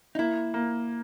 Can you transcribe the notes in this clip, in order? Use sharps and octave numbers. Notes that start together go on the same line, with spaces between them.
D#4
A#3 E4
A#3